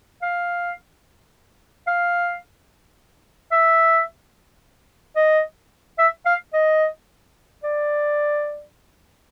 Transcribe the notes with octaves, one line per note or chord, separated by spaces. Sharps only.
F5
F5
E5
D#5
E5
F5
D#5
D5